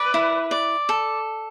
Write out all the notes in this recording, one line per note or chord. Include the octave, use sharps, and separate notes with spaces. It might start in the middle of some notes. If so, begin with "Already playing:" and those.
Already playing: B4 D5
E4
D5
A4